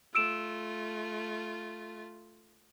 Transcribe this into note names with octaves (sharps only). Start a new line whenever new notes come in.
A3 F4 E6 D7 E7